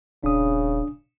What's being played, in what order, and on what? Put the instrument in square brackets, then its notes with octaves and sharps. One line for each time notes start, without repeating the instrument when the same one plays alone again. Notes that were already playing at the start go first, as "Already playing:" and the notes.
[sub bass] D#1 [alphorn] C#3 [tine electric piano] D4 D#6